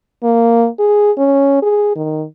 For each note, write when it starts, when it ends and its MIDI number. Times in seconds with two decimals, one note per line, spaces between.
0.23 0.68 58
0.79 1.11 68
1.18 1.59 61
1.62 1.91 68
1.96 2.25 51